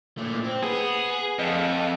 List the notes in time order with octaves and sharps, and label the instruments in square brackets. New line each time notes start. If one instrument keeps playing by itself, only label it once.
[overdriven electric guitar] A#2 A3
C4
[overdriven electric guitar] B3 [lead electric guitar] G#4
[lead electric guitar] F2 [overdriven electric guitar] D#5 F5